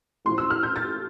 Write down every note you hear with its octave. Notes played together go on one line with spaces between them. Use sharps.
A1 A2 F3 C6
E6
F6
G6
A6